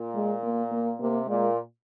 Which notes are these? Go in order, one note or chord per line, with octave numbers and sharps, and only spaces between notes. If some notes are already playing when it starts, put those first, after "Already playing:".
Already playing: A#2
G#3
A#3
A#3
C3 A#3
A#2 G#3